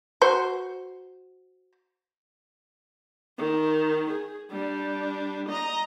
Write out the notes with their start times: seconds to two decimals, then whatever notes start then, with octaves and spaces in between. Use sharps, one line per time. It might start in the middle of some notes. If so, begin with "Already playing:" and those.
0.22 F#4 C5
3.38 D#3
4.11 G#4
4.51 G3 D4
5.49 D#5 A#5